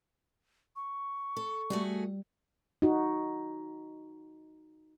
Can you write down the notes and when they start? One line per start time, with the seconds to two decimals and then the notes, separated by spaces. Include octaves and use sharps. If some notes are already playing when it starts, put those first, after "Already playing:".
0.76 C#6
1.37 A4
1.70 G3 A3 F#4 G#4
2.82 D#4 F#4